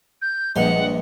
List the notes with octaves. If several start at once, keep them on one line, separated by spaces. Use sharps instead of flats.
G6
A#1 G2 G#3 D#5 F#5 C6